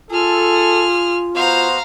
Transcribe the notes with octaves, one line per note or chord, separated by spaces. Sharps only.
F4 G#4 A4 F6
B3 F#4 C5 F5 A#5